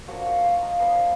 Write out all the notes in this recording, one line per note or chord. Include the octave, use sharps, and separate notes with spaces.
F3 A#3 D4 F#4 F#5
F#4 F#5
F4 F5
D#4 D#5
F3 A#3 B3 D4 B4